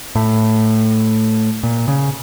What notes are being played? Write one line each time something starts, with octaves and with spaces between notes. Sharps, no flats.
A2
A#2
C#3